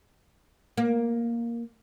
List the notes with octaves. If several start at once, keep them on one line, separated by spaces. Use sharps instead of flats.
A#3